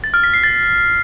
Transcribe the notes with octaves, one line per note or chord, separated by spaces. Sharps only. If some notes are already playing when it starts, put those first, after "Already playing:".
A6
F6
B6
C7
A6